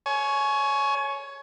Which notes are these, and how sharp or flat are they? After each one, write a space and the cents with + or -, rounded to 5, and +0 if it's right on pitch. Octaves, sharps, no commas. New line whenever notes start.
C#5 +0 G#5 +30